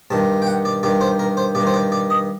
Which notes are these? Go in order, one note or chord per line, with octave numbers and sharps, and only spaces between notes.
G2 D#3 A5
G5
F#5
D5
G2 D#3 D5
C5
A#4
C5
G2 D5
D#3
C5
D5
D5
D#5